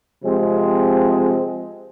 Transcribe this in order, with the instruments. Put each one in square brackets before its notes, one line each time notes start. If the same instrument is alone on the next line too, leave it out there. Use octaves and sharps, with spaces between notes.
[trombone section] C3 F3 G#3 C4